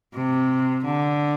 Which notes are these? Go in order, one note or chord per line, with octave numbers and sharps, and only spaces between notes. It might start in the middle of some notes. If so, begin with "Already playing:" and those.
C3
D3